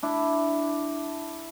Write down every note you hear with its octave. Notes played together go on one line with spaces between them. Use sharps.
D4 E4